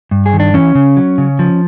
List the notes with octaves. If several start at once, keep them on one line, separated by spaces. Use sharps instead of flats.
G2
G#4
D#3
D4
E3 C#4
C#3
F#3
C#3
F3